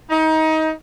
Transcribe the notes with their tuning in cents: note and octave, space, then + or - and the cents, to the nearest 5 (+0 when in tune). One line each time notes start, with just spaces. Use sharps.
D#4 +25